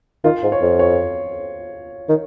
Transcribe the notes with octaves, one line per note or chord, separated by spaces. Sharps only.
D#3 F4
G#2
C#5
F2
C#5
D#3